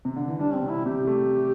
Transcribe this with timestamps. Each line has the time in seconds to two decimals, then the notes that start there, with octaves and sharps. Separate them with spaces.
0.05 C3
0.16 D3
0.28 E3
0.39 G3 D4
0.54 C4
0.62 C3
0.69 E4
0.85 C3 G4
1.07 A3